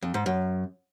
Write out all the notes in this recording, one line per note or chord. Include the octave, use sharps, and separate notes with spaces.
F2
G#2
F#2